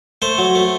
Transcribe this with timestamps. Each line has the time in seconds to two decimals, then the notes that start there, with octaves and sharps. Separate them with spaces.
0.22 A3 C5
0.38 F#3
0.55 A3